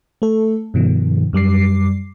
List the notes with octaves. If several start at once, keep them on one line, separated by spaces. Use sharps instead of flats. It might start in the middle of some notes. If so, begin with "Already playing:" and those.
A3 A4
G2 B2 D#3 F3
F#2 G3 D6 C7